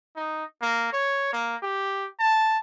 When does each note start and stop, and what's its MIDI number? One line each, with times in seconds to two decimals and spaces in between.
0.16 0.44 63
0.62 0.91 58
0.93 1.32 73
1.33 1.56 58
1.63 2.08 67
2.19 2.58 81